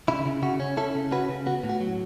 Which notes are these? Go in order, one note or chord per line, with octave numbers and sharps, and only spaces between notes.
C#3 E4
C#3
C#3 F#4
C#4
C#4 E4 A4
C#3
C#4 F#4 B4
C#3
B3 F#4
A2
F#4
F#3